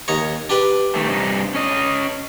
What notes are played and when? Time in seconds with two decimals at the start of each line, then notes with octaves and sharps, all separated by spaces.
0.08 D#2 D#4 C#5
0.50 D4 G4 B4
0.95 D#3 A3
1.08 G2 C3 D#4
1.55 C#4 D#5